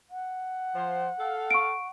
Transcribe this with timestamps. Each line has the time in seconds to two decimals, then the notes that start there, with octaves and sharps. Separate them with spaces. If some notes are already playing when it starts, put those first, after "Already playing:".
0.10 F#5
0.75 F3 C5
1.19 A4 F5
1.51 C#6 D7